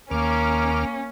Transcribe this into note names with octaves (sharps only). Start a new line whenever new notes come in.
D#2 A#3 C#4 A#4 D6 F6